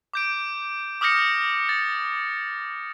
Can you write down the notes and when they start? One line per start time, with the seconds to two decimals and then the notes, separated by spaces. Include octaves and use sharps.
0.14 D6 G6 D7
1.01 D6 D#6 F6 G6 A#6 C#7
1.69 A6